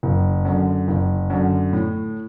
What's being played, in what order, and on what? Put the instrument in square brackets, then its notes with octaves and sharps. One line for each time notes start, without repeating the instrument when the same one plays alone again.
[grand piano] F#1
F#2 D3
F#1
F#2 D3
A2